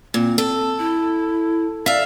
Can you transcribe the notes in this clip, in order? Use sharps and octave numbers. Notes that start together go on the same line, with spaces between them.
A#2 C4
A4
E4
D5 E5 F5